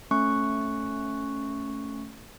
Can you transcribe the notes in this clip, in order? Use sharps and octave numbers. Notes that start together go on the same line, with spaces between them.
A3 C#4 C#6 F#6